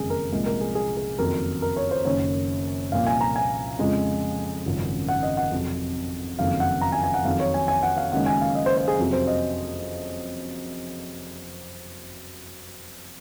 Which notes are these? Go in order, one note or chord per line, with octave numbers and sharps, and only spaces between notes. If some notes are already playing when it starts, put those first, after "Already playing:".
Already playing: F#1 F2 D#3 G#3 G#4
A#4
C2 A#2 F3 G#3
A#4
G#4
G#4
G#4
F#1 F2 D#3 F#3 A#4
A#4
C#5
C5
F#1 F#2 D#3 C#5
C2 A#2 F3 F5
G#5
A#5
G#5
F2 C#3 F3 G#3
G#1 F#2 C#3 F3
F#5
D#5
F#5
F2 C3 F#3
F#1 F2 D#3 F#3 F5
F#5
A#5
G#5
G#5
F#5
F2 D#3 F#3 F5
C#5
G#5
G#5
F#5
F5
F#1 F#2 D#3 G#3 F#5
G#5
F5
D#5
C5
C5
G#4
F2 C3 F#3
C5
D#5